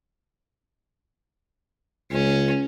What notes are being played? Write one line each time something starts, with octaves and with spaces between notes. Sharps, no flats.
C#2 C#4